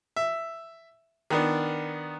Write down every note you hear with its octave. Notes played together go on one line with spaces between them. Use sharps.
E5
D#3 B3 D4